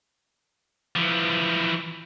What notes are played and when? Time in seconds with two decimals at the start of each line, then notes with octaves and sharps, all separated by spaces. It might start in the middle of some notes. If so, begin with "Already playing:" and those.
0.96 E3 F3